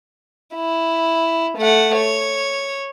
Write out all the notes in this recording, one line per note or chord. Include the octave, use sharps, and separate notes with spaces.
E4
A3 F#5
C#5